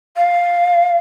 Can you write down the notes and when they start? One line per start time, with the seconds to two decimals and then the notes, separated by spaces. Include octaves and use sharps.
0.17 F5